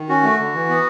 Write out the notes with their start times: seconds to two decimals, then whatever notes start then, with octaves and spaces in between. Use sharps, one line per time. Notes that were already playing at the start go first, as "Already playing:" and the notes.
Already playing: D#3
0.09 C#4 F#4
0.23 A3
0.39 D3
0.54 E3
0.69 B3